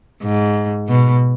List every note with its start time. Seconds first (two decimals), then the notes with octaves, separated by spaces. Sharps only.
0.22 G#2
0.88 B2